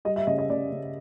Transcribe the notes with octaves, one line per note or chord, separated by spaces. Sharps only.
G3 D#5
E5
C#3 D#5
D#5
C#3 D5
C#3